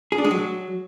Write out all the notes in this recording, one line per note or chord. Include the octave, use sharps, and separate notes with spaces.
G#4
D4
G#3
F#3